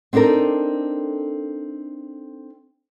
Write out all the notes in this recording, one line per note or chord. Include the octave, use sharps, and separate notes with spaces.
C4 D4 D#4 A4 A#4